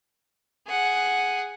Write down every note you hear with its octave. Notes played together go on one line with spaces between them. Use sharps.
G#4 F#5